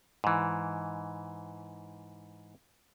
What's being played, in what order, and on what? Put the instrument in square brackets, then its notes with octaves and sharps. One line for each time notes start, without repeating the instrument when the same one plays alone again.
[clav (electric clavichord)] G#2 E3